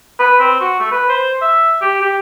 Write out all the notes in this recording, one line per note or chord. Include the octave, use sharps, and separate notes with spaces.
B4
C4
F#4
A3
B4
C5
E5
G4
G4